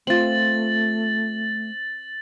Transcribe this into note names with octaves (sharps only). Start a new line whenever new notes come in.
A3 C4 F4 A6 F#7